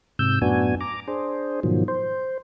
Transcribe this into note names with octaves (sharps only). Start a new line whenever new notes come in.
G#2 C3 E6 G6
F#2 A2 B3 D4 F#4 G#5
A#5 D6
D4 G#4 C5
G#2 B2 D#3 F3 F#3
C5